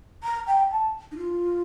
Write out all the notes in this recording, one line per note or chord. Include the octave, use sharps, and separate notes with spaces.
A#5
G5
A5
D#4
F4